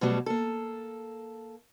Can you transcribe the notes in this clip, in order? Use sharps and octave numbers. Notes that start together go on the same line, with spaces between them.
B2 F#3 G3 A3 F#4
A#3 A4